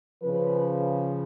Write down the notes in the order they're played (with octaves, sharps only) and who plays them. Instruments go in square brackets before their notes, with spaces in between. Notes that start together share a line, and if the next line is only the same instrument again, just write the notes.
[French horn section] C#3 F3 B4